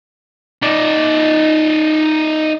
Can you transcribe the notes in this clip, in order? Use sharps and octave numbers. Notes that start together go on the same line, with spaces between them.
D#4 D5